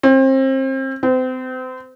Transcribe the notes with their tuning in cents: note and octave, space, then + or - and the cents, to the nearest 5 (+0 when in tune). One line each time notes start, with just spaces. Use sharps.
C4 +30
C4 -35